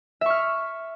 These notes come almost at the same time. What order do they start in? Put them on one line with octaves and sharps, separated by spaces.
E5 C#6 F6